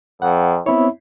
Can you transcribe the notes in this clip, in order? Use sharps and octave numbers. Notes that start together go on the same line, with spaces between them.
F2 F#5
B3 C4 E4 C#5